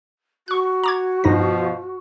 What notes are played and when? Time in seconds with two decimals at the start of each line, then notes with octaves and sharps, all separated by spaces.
0.48 F#4 C#6 F#6
0.84 A#5 D6 G#6
1.24 G2 B2 F3 D#4 A#6